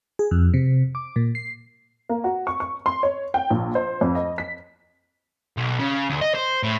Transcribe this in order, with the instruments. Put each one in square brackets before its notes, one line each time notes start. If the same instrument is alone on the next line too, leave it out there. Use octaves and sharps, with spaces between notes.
[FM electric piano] G#4
F2
C3
D6
A#2
C7
[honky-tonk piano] A#3
F#4
C#6
C#6
C6
C#5
G5
A#1
C5
F2
D#5
B6
[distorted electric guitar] B1
C#3
D2
D#5
C5
A2